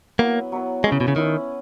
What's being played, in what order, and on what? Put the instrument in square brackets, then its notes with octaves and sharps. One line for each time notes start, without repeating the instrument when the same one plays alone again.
[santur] F#3 B3 E4 B4 [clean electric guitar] A#3
[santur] F#3 B3 E4 B4
[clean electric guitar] G#3 [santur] C#4 E4 B4
[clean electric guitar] C#3
B2
C#3
[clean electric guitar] D#3 [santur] C#4 E4 B4